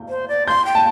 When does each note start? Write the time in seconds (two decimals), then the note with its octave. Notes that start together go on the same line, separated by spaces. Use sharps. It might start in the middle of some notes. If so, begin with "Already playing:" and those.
Already playing: G6
0.09 C5
0.28 D5
0.47 C6 G6
0.65 G5
0.75 A5